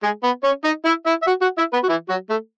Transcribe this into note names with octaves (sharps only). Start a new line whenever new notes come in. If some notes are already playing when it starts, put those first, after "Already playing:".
G#3 G#4
B3 B4
C#4 C#5
D#4 D#5
E4 E5
E4 E5
E5
F#4 F#5
F#4 F#5
E4 E5
B3 B4
F#4
E3 E4
F#3 F#4
A3 A4